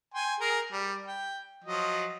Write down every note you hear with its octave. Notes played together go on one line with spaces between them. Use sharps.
G5 G#5 C6
G#4 A#4
G3
G5
F3 F#3 D#5